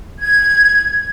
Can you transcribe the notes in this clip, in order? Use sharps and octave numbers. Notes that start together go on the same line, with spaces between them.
G#6